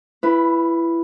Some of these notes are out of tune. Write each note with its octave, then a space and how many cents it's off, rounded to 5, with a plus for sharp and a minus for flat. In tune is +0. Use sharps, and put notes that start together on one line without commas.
E4 +25 B4 +0